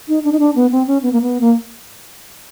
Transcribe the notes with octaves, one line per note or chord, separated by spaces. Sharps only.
D#4
D4
D#4
D4
B3
C4
C#4
B3
A#3
B3
A#3